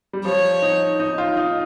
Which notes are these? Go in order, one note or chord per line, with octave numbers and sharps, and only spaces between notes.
G3
F3 C#5
D#4
D#4
F4
D#4